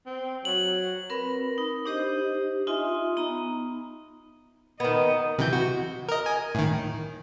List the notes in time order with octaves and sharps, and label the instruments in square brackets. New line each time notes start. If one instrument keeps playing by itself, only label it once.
[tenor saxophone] C4
[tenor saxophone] F#3 [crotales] F#7
[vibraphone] C4 A#4 B4 B5
D#4
D4 D#4 G4 C5 D#5
D#4 F4 D#5 E5 G#5 C6
B3 D#4 A#5
[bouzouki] D#3 B3 [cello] D#5
[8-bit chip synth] C3 E3 G6
F#4
A#4 D#5
G#5
A2 D#3